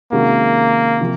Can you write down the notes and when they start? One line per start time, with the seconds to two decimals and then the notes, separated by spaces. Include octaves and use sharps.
0.12 C3 D#3 G#3 A#3 C#4 F#4
1.00 C3 F3